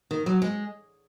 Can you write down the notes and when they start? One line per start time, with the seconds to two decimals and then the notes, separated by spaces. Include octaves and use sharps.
0.11 D#3
0.26 F#3
0.42 G#3